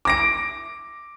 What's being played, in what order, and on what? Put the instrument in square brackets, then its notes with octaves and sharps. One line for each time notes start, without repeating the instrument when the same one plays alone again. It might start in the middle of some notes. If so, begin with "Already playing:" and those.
[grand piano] D6 A#6 D7